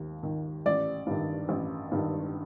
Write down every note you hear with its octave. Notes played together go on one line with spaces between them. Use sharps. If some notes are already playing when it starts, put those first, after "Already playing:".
Already playing: D#2
D#3
A1 D5
G2 D#3
A1
G2 D#3